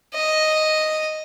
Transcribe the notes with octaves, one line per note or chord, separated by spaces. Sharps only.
D#5